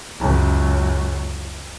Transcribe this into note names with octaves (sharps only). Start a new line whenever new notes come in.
C#2 F#2